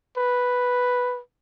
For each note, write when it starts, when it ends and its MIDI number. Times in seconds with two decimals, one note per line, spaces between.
0.17 1.20 71